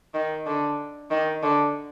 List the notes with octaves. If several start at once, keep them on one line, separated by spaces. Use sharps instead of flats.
D#3
D3
D#3
D3